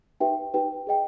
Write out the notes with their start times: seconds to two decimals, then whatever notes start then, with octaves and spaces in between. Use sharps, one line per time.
0.20 D#4 G4 B4 E5 G5
0.54 D#4 G4 B4 G5
0.87 G#4 D#5 G5